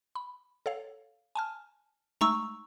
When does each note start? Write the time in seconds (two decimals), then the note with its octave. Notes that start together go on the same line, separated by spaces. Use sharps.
0.15 B5
0.66 A4 C#5 F5
1.35 G#5 A5 F6
2.21 G#3 A3 D#4 A#5 C#6 E6